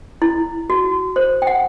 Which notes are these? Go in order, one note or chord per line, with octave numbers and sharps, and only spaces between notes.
E4
F#4
C5
G5
F#5